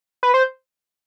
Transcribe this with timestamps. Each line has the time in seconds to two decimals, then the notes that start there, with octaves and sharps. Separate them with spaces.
0.23 B4
0.34 C5